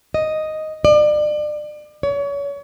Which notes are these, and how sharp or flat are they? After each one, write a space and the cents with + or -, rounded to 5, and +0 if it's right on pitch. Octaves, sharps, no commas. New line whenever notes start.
D#5 +0
D5 +35
C#5 +30